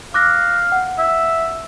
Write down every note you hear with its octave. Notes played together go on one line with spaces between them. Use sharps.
F5 D6 F#6 A#6
F#5
E5